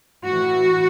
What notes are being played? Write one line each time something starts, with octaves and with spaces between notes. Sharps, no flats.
A2 E3 F#4